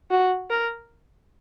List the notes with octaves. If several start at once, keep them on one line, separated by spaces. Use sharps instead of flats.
F#4
A#4